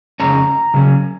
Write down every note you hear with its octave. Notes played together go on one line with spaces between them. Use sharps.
F2 C#3 G#3 C#4 A#5
C#3 F#3 C#4